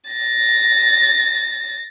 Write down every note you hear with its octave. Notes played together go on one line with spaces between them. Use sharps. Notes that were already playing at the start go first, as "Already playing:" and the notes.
A6 A#6